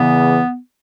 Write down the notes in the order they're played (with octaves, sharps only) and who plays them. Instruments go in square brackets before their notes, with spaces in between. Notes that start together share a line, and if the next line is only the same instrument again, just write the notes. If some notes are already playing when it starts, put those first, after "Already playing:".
Already playing: [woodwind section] E2 C#3 E3 B3